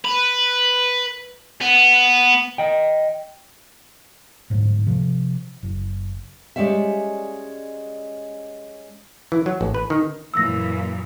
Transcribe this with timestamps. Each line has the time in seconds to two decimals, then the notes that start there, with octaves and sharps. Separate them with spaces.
0.05 B4
1.61 B3
2.58 D#5 G5
4.50 D1 G#2
4.87 C3 F3
5.63 F#1
6.56 G3 G#3 C#4 D5 E5
9.32 E3
9.46 F#3
9.61 A1
9.75 B4
9.90 D#3
10.34 F#2 A#2 E3 E6 A#6